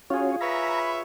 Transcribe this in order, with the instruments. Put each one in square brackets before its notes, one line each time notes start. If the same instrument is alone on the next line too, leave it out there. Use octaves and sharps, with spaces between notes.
[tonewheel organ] C#4 F#4 C#5 [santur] F4 G#4
[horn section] B4 C#5 E5 [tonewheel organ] A#5 [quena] B5